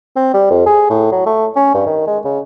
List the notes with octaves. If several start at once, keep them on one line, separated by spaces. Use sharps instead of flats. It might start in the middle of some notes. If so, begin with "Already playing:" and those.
C4
G3
F2
G#4
A2
F#3
A3
C#4
G2
D#3
G#3
C#3